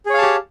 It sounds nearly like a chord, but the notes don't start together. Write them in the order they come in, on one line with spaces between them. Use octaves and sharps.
G#4 C#5 F5 A5 G4